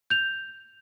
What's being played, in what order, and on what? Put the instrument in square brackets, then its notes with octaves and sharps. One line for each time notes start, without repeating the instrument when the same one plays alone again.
[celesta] G6 F7